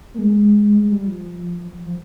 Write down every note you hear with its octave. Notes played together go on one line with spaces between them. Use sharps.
A#3
G#3
G#3
G3
F3
F3